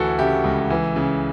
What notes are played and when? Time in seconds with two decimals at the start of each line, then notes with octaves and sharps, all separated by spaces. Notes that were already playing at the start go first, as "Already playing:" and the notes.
Already playing: D2 E3 F#4 A4
0.19 C#3 E4 G4
0.44 C#2
0.70 E3
0.96 C#3